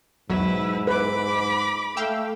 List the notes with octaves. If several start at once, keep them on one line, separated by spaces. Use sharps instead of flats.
B1 E2 G#2 F#3 E4 B4
B4 B5 D6
A3 F5 G5 E6